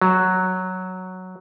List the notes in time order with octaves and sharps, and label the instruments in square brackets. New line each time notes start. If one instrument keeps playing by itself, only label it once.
[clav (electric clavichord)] F#3